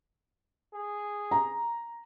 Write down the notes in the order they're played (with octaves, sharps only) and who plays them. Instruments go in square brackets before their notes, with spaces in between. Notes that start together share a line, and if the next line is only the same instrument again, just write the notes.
[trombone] G#4
[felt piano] A#5